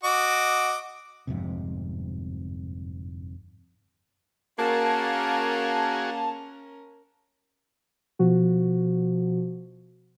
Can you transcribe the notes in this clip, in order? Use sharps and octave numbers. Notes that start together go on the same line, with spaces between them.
F#4 D#5 D6
G1 F2 G#2 C3
A#3 C#4 F#4 G#4 A#4 A5
B2 F3 F#4